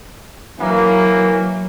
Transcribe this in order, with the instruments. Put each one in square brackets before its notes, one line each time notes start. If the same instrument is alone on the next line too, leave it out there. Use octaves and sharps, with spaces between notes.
[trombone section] E3 A#3 [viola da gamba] F#3